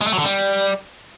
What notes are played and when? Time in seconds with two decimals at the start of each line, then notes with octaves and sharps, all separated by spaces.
0.01 G#3
0.07 A3
0.13 F#3
0.18 D3
0.24 G3